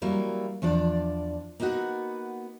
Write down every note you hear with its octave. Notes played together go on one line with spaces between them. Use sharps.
F#3 G3 A#3 E4
E2 F3 D4 D5
A#3 B3 D#4 F#4 F#5